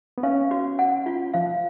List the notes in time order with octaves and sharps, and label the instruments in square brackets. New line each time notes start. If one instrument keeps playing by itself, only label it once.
[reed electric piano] B3
[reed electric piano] C#4 [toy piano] F5
[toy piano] F#4
F#5
F4
[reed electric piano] F3 [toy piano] F5